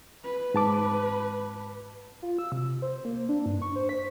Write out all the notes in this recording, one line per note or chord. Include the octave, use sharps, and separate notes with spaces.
B4
G#2 A5 D6
F4
E6
C3
C5
A#3
D4
G2
C#6
C5
B6